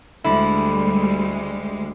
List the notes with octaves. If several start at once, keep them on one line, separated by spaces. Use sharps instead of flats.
D2 D3 G3 G#3 E4